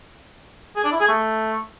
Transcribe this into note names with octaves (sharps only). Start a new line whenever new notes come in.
G#4
D4
E4
G#4
A3